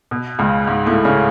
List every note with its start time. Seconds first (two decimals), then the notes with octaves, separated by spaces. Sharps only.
0.11 B2
0.39 C#2 C#3
0.67 G#2 G#3
0.86 A2 A3
1.05 C#3 C#4